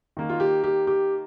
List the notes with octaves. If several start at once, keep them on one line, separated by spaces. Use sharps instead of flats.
D#3 A#3
F4
G4
G4
G4